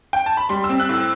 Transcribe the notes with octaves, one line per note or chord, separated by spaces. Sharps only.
G5
A5
B5
G3 C6
E6
C4
F#6
A2 E6